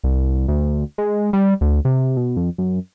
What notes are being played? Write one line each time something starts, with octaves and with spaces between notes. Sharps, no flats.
C2
D2
G#3
G3
D2
C3
B2
F2
F#2